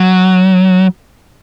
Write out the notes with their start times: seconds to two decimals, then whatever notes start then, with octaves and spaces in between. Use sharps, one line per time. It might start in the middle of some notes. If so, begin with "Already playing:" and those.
Already playing: F#3